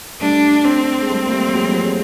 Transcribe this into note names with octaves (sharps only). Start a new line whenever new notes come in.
G3 A3 D4
C4
G#3
G3 A3
A#3
G3 A3
G3
F#3 G#3
F3 G3
F#3 G#3